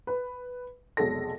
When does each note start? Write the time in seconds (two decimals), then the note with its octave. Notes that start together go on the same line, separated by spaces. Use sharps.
0.07 B4
0.97 F1 B1 G#3 A4 A#6